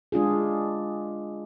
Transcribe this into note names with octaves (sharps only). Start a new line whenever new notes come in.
G#3 D4 F4 G#4